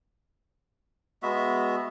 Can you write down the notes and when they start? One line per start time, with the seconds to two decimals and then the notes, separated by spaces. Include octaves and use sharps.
1.23 G#3 B3 F#4 E5